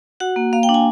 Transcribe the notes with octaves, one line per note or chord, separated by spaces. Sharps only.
F#4 F#5
A#3
A#3 F5
G5
D4
G#5